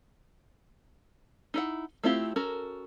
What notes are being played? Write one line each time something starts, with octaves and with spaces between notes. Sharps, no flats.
D#4 E4 F#5
A3 C4 E4 F4 G4
C#4 F#4 A4 A#4